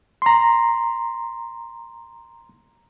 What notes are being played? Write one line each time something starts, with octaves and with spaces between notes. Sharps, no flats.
A#5 C6